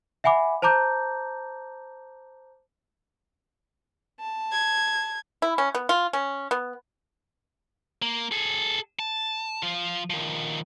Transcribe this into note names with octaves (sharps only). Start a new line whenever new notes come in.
E5 F#5 G#5 B5 D6
C5 A5 A#5 D6 G6
A5
G#6
E4
C#4
B3
F4
C#4
B3
A#3
G#4 A4
A5
F3 F4
D#3 F3